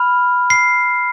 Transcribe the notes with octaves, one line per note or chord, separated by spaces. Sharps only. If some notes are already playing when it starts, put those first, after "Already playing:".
Already playing: B5 F6
C7